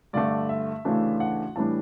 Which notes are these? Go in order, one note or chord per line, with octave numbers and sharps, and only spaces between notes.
G2 D3 A3 D5
E5
D2 C#3 E3 A3 D4
F#5
A2 E3 G3 D4 A5